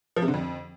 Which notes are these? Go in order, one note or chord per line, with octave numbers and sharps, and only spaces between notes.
F3
C3
D3
F2